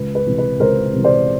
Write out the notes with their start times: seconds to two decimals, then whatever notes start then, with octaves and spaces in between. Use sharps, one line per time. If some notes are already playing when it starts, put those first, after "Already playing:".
Already playing: C#2 B4
0.15 B4
0.26 C3 E3
0.38 B4
0.59 C#2 A#4 C5
0.93 C3 E3
1.04 C5 D5